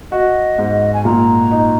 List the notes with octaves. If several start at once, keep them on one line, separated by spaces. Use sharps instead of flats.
F#4 D#5
G#2
G#5
A#2 A#5
D#4